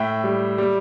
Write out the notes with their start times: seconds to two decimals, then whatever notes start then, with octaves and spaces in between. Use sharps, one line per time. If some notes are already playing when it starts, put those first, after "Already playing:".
Already playing: A2 E5 G5
0.24 G3
0.58 G3